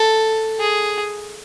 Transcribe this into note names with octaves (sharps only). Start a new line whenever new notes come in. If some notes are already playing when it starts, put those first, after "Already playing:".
Already playing: A4
G#4